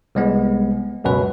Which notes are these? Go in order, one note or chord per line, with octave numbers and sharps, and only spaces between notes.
C2 G#3 B3
C#2 F#2 B2 B4